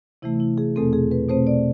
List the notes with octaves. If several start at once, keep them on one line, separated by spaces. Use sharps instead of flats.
C3 E3 A3 E4
E4
G#4
E2 B2 A3 C4 A4
G#4
B4
B2 A3 C4 C5
D5